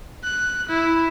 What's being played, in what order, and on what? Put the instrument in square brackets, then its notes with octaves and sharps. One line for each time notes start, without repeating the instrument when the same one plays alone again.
[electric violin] F#6
E4